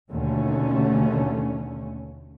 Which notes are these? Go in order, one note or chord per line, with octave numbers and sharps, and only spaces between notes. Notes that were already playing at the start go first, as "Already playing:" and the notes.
D#2 B2 D3 A3 C#4